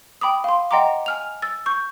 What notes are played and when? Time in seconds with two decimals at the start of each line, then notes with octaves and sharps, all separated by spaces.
0.21 G5 B5 D6 D#6
0.44 F5 C6
0.71 D#5 F#5 G5 A#5 C6 D6
1.06 G#5 F6 F7
1.42 E6 A6
1.66 C#6 G6